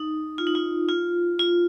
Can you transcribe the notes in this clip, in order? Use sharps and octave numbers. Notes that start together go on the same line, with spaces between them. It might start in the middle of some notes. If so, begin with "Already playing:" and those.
Already playing: D#4
F4
D#4
F4
F4
F4